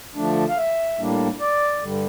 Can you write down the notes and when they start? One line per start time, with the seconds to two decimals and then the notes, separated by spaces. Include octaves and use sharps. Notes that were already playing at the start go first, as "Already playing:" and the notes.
0.16 D3 F3 A3 D4
0.49 F5
0.58 E5
0.99 A2 G3 A#3 D4
1.40 D5
1.82 G2 D3 G3